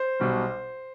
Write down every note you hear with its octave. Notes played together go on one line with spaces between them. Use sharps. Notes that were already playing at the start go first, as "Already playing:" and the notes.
Already playing: C5
B1 B2 G3